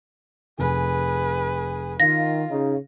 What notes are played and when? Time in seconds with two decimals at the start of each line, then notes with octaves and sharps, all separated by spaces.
0.59 F1 G#4 B4 G#5
2.00 D#3 F4 F5 A#6
2.49 C#3 D#4